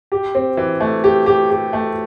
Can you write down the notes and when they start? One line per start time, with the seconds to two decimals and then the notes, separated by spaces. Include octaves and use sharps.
0.12 G4
0.35 C4
0.57 E3
0.80 A3
1.04 G4
1.26 G4
1.50 G4
1.73 A3